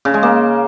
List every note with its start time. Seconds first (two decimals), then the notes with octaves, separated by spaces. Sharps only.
0.05 C#3
0.14 G#3
0.23 A#3